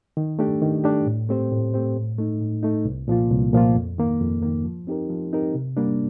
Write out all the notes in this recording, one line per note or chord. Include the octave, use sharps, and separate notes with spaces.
D#3
A3 D4 G4
D#3
A3 D4 G4
A2
A3 C4 G4 C5
A2
A3 C4 G4 C5
A2
A3 D#4
A2
A3 D#4
C2
A#2 F3 A#3 F4
C2
A#2 F3 A#3 F4
F2
D#3 A#3
F2
D#3 A#3
F3
C4 D#4 G4 A#4
F3
C4 D#4 G4 A#4
C3
G3 A#3 D4